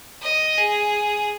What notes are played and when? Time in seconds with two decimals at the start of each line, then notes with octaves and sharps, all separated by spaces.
0.22 D#5
0.58 G#4